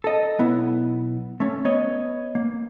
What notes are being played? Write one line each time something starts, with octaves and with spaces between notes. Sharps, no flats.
A4 D#5
B1 B3 E4
A3 C#4
B3 C#5 D#5
A#3